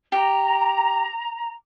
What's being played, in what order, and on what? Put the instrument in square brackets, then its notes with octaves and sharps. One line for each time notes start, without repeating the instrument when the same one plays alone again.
[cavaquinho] G4 [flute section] A#5